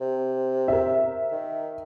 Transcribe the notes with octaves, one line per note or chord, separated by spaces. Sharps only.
C3
A#4 E5
D#3